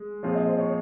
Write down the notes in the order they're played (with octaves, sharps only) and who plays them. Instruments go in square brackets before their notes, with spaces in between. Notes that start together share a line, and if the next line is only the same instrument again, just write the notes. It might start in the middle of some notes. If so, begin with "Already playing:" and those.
Already playing: [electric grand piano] G#3
[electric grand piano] A#2 F3 C4 F4 G#4 [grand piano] C#5
[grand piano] D#5
C5
C#5